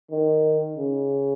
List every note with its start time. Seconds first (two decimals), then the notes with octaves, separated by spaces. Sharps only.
0.11 D#3
0.77 C#3